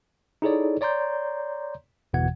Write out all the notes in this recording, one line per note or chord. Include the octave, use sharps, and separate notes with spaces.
D#4 E4 G#4 A4 C#5 D5
C#5 D5 A#5 C6 G6
G1 E2 B2 E3 F#5 G#6